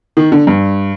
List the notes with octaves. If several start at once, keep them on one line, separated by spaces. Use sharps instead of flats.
D#3
D3
G2